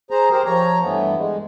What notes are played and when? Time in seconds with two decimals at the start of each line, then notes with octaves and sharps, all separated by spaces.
0.11 G#4 C5 A#5
0.31 G4 A#4 C5
0.45 F3 C#5 A#5
0.82 G2 E3 A3 B3
1.17 G#3